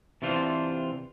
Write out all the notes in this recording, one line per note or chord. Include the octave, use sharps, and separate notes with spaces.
C3 E3 D4 F4 C5